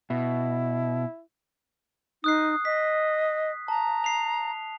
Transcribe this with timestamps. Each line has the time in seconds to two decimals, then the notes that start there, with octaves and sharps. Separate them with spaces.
0.10 B2 E4
2.24 D#4 D#6 F#6 C7
2.65 D#5 B6
3.68 A5 A#5
4.04 C7 F7